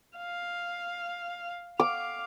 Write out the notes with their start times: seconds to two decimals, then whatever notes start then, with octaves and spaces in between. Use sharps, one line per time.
0.18 F5
1.80 F5 D6